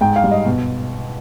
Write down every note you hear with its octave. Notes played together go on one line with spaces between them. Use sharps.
G#2 G5
F5
G3
D#5
B2